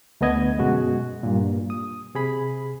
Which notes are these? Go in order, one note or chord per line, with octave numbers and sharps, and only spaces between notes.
D2 A3 B3 D#5 G#6
F#2 B2 G#3 F#4
G2 A#2
D#6
C3 G#4 B5